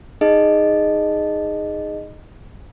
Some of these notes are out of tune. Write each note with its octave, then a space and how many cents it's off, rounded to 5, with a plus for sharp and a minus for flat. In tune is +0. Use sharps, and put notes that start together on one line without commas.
D#4 +0 G#4 +0 D#5 -15